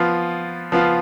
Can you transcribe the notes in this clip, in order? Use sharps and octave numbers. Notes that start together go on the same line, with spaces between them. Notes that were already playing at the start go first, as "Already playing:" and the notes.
Already playing: F3 B3 F4
F3 B3 F4